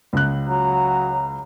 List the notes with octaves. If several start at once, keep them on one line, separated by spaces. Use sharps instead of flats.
C#2 F#6
F#3 A#5